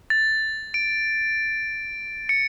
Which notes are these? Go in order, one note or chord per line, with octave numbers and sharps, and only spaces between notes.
A6
D7
C#7